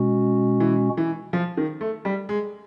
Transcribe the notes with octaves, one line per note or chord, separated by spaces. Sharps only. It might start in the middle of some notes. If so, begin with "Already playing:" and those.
Already playing: B2 G#3 C#4 F#4
E3
E3
F3
D#3
A3
G3
G#3